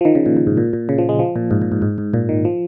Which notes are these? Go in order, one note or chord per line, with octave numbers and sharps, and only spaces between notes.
F3
D#3
C#3
A#2
A#2
G#2
A#2
A#2
C#3
F3
G#3
F3
A#2
G#2
A#2
G#2
G#2
G#2
A#2
D#3
F3